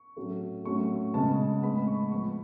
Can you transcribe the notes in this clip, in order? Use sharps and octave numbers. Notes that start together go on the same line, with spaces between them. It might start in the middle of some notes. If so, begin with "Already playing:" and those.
Already playing: C#6
A2 F#3 A3 C#4
A2 F#3 A3 C#4 C#6
C#3 G#3 B3 A5
A2 G#3 B3 B5
C#6
F3 B3 C#6